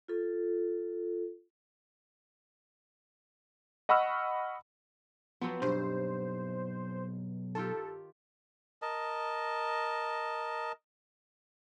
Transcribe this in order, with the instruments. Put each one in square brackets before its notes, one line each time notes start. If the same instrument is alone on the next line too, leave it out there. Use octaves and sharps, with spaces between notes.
[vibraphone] F4 A4
[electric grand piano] D#5 F#5 B5 C#6 E6 F6
[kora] F3 F#3 C4 [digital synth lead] B3
[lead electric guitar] B1 [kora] G2 [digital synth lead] C5
[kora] D#3 F4 G4 [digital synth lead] A4
[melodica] A#4 D#5 A5